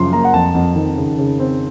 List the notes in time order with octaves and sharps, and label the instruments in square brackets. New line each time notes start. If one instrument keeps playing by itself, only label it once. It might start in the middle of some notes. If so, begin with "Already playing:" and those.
Already playing: [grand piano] F#2 C#3 F3 C6
A#3 A#5
F#5
F2 A5
F2
D#3
C#3
C#3
C4